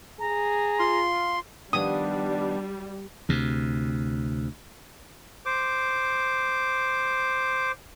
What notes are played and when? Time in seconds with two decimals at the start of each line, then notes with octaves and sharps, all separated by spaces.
0.20 G#4 A#5
0.79 F4 C6
1.73 D#3 F3 G3 B3 D4 D#6
3.29 D2 C3
5.46 C5 D6